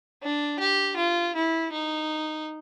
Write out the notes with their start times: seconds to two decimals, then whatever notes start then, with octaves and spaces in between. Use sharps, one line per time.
0.22 D4
0.60 G4
0.97 F4
1.35 E4
1.72 D#4